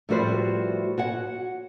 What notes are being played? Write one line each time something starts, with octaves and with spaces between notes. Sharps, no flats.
A2 F3 G3 F#4 B4 C5
F#4 C#5 F#5